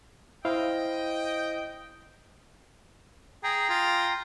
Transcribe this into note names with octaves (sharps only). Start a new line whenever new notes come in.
E4 C5 D#5 F5 G5
G#4 G5 A#5
F4